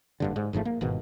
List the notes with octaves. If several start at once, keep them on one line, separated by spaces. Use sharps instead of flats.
F#1 G2 D3
G#2
G1 G#2 F3 A3
A#3
G1 G#2 B2 D#3